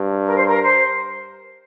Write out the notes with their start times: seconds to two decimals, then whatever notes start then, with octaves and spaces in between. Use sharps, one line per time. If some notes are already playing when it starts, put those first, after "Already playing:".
Already playing: G2
0.25 A#4
0.36 C5
0.45 A#4
0.62 C5